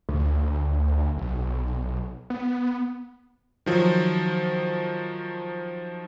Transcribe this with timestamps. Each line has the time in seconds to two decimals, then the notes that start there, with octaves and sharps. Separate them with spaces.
0.09 D2
1.17 B1
2.30 B3
3.66 D#3 F3 F#3